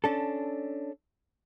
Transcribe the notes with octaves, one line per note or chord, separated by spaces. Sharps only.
C#4 D4 A4